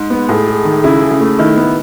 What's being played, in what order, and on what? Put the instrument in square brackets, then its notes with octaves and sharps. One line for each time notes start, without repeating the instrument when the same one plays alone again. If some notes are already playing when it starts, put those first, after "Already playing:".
Already playing: [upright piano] G#2
[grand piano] B3
[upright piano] A2 [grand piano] G#4
[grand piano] G#4
D#3
[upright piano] C#3 [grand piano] E4
[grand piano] G#4
[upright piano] C#3
[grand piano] A3
[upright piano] D#3 [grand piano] E4
[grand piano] B3